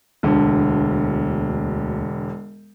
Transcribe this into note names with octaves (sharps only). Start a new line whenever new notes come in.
E1 D2 D3